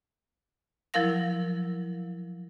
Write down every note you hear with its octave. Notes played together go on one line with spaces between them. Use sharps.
F3 F#3 E4 A#4 F5 A#6